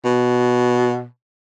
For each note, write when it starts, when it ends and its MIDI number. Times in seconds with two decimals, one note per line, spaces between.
0.05 1.05 47